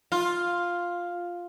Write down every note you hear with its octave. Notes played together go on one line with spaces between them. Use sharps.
F4